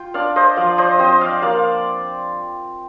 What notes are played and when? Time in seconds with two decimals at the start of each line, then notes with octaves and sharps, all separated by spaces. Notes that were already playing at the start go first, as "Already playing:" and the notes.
Already playing: F4 G5
0.14 D4 D5 F5
0.36 C5 D#5
0.57 F3 D5 F5
0.78 C5 D#5
0.99 C4 C5 D#5
1.21 D5 F5
1.42 A#3 D5 F5